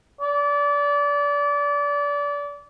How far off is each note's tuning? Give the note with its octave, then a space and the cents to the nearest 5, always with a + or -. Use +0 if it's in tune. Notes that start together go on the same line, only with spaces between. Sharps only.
D5 -25